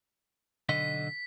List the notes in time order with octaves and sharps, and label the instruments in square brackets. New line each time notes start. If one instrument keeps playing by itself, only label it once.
[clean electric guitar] B1 D3 D#5 [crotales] B6